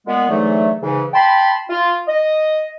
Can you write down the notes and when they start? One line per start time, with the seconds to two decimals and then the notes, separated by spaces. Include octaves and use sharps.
0.07 A#2 G#3 B3
0.29 G#2 D3 E3 F#3 A3
0.83 G#2 C#3 E3
1.14 G5 A5 B5 C6
1.69 F4
2.07 D#5